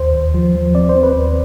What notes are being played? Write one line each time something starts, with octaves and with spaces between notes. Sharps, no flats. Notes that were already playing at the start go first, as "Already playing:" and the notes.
Already playing: D#2 C5
D#2
F3
F3
C4 D5
C5
C4
B4
D#2